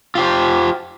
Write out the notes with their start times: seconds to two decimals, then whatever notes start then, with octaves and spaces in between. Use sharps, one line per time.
0.15 F4 G4 C5